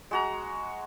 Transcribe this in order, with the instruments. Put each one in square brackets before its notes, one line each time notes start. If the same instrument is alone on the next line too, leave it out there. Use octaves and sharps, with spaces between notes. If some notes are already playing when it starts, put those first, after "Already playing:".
[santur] G#3 F#4 A#5